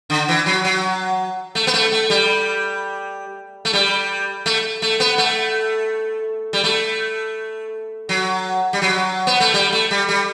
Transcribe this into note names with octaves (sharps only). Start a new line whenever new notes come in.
D3
E3
F#3
F#3
A3
B3
A3
A3
G3
A3
G3
A3
A3
B3
A3
G3
A3
F#3
G3
F#3
B3
A3
G3
A3
G3
G3